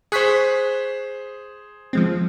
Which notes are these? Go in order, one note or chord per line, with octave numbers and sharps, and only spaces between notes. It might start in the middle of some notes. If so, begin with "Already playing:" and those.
G#4 C5 C#6 F#6 B6
F3 G#3 C4